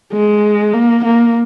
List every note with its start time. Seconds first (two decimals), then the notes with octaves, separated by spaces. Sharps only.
0.12 G#3
0.73 A#3
1.04 A#3